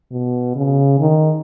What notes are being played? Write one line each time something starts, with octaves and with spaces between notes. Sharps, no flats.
B2
C#3
D#3